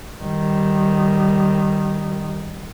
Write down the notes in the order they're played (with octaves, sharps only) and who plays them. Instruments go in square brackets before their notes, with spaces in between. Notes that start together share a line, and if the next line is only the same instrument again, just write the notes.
[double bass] D#3 G3